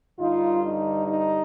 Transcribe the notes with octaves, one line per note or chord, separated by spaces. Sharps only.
G2 D3 G3 D#4 F4
D#4
D#4